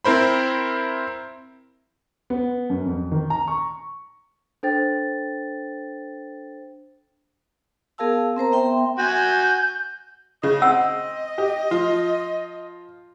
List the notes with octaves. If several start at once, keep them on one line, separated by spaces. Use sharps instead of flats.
C4 E4 A#4 C5 B5
B3
F#2
F2
D#3
A#5
C#6
D4 A4 C5 G5 A6
B3 G#4 A#4 F5 A5 E6
C4 A#4 C5 A#5
B3 E5 G5 C6
F#4 G#5 G6
C#3 D#5
C4 F#5 E6
G4
F3 F4